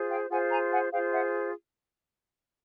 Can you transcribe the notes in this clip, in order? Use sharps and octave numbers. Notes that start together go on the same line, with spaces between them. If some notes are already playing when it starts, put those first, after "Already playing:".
Already playing: F4 G#4 C5
F5 G5
F4 G#4 C5 F#5 G#5
G#5 A#5
F#5 G#5
F4 G#4 C5 F5 G5
E5 F#5